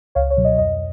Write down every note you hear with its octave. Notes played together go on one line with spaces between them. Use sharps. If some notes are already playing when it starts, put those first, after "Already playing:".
C#2 C#5 F5
C#5
B2 F#3
D#5
F2 D#5